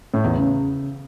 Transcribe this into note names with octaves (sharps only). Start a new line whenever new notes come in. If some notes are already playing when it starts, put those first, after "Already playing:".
A2
E2
C#3